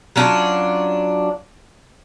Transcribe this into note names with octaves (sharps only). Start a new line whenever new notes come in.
F#3 C#4 D4 F4